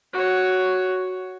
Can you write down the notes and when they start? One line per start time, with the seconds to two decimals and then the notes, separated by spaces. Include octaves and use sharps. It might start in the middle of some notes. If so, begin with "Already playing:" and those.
0.13 F#4 C#5